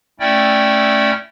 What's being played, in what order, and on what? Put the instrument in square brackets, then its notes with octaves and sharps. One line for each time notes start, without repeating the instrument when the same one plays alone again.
[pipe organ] A3 C#4 E4 D5 G5